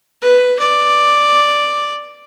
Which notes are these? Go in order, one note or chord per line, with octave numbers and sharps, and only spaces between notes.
B4
D5